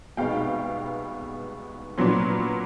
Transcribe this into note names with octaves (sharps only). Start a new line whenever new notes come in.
C2 B2 G#3 B3 D#4 F5 G5
A#2 F#3 B3 D4